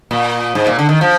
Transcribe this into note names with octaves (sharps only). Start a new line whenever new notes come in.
A#2
G#2
A#2
D3
D#3
F3